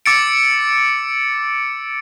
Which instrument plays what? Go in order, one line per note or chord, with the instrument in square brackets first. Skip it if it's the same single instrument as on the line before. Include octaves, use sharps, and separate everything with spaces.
[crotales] D6 E6 A6 C#7 D7